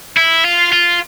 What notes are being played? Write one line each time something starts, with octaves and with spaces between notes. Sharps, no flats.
E4
F4
F4